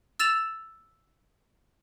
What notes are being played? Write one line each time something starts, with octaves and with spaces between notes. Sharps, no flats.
E6 A6 E7 F7